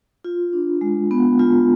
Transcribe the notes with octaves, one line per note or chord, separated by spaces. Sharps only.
F4
D4
G#3
B3
F4